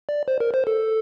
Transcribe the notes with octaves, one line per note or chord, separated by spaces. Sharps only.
D5
C5
A#4
C5
A4